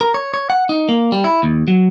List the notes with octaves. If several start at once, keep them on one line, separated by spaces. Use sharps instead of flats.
A#4
C#5
C#5
F#5
D#4
A#3
G3
E4
D#2
F#3